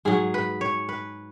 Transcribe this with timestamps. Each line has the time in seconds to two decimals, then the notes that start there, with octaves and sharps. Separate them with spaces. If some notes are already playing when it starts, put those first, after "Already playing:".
0.05 G#2 F#3 G#4
0.34 B4
0.61 C#5
0.89 B4